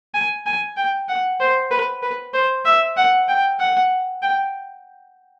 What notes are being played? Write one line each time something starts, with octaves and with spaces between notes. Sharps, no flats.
G#5
G#5
G5
F#5
C5
B4
B4
C5
E5
F#5
G5
F#5
G5